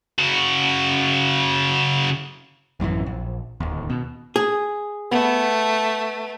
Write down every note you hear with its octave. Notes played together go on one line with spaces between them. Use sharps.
C#3 F#4
A1 F#2 D#3 E3
A#1
D1 D#2
B2
G#4
A3 B3